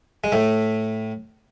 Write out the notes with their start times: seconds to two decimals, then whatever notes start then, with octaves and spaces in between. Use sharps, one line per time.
0.24 G#3
0.32 A2 A3